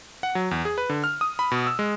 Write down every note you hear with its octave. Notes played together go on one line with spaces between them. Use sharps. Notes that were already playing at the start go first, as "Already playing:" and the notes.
F#5
F#3
E2
G#4
B4
D3
F6
D#6
B5
B2
E6
G#3